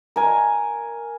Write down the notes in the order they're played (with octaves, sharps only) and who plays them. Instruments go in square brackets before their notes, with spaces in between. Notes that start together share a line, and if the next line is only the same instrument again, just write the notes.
[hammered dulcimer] A#4 G#5